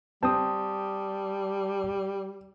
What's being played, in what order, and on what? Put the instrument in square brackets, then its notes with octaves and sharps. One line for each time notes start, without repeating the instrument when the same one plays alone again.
[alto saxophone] G3 [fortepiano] C4 [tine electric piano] A5 D#6